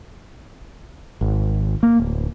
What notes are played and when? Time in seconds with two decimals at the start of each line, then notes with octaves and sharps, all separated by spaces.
1.21 G#1
1.83 A#3
2.00 D1